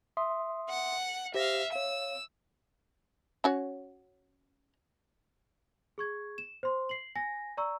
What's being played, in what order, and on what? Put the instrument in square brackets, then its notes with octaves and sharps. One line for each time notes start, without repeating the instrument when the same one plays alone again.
[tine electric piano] E5 C6 D#6
[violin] F#5
[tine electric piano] G4 C5 A#6 [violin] E5 F5
[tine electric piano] C#5 F5 [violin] E6
[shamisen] C#4 F#4 C#5
[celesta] G#4 C#6 G#6
E7
C5 C6
C7 F#7
G#5 A#6
D5 A#5 C#6 E6